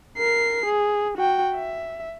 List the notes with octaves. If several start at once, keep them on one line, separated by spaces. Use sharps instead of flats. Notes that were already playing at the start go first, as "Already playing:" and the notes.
A#4 C7
G#4
F#4 G5
E5